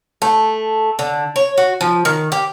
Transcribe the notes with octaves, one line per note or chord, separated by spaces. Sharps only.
A3
D3
C#5
F#4
F3
D#3
G4